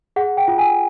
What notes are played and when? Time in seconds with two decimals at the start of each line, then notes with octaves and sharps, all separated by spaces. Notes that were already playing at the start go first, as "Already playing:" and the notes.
0.16 G#4 F#5
0.37 G5
0.48 F4
0.58 G#5